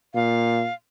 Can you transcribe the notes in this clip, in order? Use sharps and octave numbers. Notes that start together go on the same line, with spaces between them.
A#2 F5